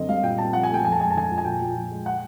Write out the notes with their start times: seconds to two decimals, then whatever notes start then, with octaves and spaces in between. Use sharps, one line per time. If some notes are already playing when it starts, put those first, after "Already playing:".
Already playing: F#2 D3 C4 D#5
0.09 G3 F5
0.23 A#2 G5
0.38 C4 A5
0.53 F3 F#5
0.63 G#5
0.69 A3 G5
0.84 F2 G#5
0.92 A5
0.99 G#3 G#5
1.10 A5
1.15 D3 G#5
1.30 F3
1.38 G#5
1.45 A#2 G5
1.61 A#2
1.75 F3
1.91 G#3
2.06 F#5